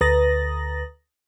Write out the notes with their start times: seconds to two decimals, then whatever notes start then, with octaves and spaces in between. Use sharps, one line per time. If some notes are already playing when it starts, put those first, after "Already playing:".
0.01 D2 B4 A#5 D#6 A6 A#6